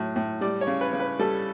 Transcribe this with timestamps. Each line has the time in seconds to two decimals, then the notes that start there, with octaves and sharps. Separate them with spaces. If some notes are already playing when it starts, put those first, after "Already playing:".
Already playing: A2 F#3
0.16 A2
0.41 G3 D5
0.61 C#5
0.67 C#3
0.81 B4
0.93 C#3
1.00 B4
1.19 G3 A4